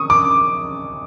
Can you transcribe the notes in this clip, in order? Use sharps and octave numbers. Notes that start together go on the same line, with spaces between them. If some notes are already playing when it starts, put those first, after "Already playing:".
Already playing: C#6 D#6
D6